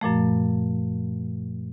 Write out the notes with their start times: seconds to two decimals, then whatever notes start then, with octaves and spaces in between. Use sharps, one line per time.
0.01 F#2 A#2 F3 A3